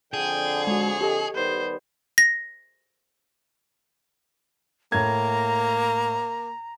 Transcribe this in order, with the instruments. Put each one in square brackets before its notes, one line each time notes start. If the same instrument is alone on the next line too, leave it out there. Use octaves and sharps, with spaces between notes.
[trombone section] F2 D3 [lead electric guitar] G#4 [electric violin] G5
[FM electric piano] G#3 F#4 [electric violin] C#5
[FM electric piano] G4 A4 D#5
[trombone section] D#3 G3 B3 [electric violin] C5
[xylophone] A#6
[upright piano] A2 G#6 [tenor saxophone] A#3 [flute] A#5